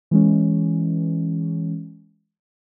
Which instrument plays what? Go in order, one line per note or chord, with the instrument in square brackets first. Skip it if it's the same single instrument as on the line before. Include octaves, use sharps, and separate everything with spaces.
[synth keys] E3 G#3 C#4